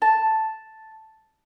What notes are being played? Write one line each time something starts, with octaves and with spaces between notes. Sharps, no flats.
A5